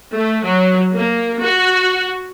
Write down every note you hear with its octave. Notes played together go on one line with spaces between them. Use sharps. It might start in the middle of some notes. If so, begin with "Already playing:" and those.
A3
F#3
A#3
F#4